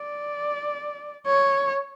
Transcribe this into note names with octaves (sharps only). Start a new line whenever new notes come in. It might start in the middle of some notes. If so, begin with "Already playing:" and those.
Already playing: D5
C#5